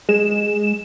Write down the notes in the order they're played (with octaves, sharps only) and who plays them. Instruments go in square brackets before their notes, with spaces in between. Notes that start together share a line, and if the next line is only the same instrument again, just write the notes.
[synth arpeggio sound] G#3 E7